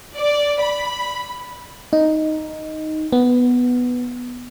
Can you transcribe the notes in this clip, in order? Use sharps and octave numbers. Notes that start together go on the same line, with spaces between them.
D5
B5
D#4
B3